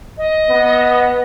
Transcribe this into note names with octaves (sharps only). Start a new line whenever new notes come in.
D#5
B3